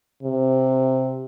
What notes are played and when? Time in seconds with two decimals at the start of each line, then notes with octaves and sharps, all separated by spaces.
0.23 C3